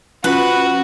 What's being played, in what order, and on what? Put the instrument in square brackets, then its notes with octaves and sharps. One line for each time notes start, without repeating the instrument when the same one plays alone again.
[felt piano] F3 [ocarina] C#4 [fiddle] F#4 [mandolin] B4